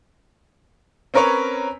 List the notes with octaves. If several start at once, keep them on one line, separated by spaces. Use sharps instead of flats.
C4 C#4 A#4 B4 C#5